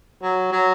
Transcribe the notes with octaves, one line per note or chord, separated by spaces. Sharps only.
F#3
F#3